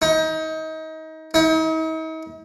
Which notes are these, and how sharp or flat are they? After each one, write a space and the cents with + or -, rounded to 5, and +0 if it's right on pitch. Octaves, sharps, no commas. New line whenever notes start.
D#4 +30
D#4 +45